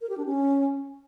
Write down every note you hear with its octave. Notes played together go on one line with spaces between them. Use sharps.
A#4
G4
D4
C#4